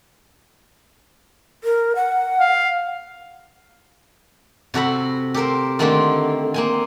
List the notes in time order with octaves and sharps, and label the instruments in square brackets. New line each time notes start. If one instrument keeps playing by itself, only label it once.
[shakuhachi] A#4
F#5
[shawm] F5
[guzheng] C3 F#4 A4 B5
G4 A4 A#4 C5
D3 D#3 A3 A#3 C4 F4
A#3 C4 G#5